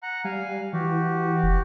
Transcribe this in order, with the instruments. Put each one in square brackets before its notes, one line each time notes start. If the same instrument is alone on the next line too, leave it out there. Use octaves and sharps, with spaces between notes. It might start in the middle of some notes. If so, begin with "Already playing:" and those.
[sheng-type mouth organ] F#5 A#5 F#6
[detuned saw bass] G3 [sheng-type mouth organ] F5 G#5
[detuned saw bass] E3 [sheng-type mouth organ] F#4 G4
[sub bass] F1